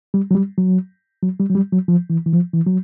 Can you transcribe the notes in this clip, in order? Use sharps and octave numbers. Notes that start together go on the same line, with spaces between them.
G3
F#3
G3
F#3
F#3
G3
F#3
G3
F#3
F3
E3
E3
F3
E3
F#3